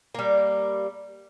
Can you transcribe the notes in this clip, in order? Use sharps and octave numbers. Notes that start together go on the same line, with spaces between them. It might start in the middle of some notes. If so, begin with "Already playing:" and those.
G3 A#3